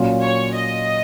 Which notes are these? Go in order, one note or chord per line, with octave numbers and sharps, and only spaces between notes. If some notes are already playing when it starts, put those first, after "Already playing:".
Already playing: A#2 F#3 C#4 F4
C#5
D#5